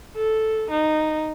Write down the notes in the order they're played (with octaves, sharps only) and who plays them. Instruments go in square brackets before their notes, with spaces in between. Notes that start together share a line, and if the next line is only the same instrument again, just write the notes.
[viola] A4
D#4